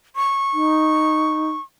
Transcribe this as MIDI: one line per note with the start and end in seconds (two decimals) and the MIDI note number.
0.16 1.61 85
0.54 1.49 63